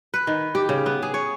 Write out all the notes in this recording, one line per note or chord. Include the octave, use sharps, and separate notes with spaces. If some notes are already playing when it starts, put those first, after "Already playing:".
B4
D#3
G4
C#3
B3
G#4
C#5